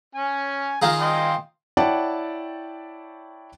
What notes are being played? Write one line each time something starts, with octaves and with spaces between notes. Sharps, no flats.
C#4 G#5
D#3 F4 G#4 A#5
D#5 G5 C6
E4 C#5 D5 F#5 G5 A5